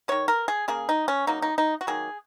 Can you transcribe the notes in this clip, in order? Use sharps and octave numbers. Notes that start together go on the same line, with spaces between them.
D#3 G#3 C#5
A#4
G#4
C#3 A#3 G#4
D#4
C#4
C#3 F#3 A#3 D#4
D#4
D#4
F#4
D#3 F#3 A#3 G#4